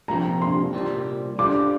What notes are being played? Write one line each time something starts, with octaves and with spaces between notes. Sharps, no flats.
C2 A#2 F3 C4 A#5
C6
C2 A#2 G3 C4
D3 G3 D4 F4 C5 D6